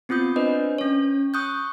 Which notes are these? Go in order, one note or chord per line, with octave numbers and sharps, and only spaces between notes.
B3 C4 F4 D#6 G6
D4 B4 C5 D#5
C#4 C#5
C#6 D#6 F#6 G6